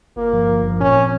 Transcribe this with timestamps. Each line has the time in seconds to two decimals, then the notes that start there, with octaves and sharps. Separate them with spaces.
0.16 G1 A#3
0.33 G2 F3
0.48 G1
0.64 G2 F3
0.80 A#2 C#4
0.96 F3 C4